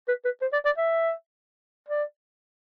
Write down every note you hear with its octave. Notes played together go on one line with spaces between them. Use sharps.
B4
B4
C5
D5
D5
E5
D5